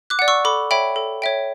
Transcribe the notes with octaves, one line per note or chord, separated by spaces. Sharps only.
D6 F#6
D5 F#5
C#6 E6
A4 B5 D6
C#5 E5 G5 B5
A4
C#5 E5 G5